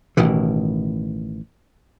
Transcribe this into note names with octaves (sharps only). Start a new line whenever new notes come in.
A1 B2 D#3 E3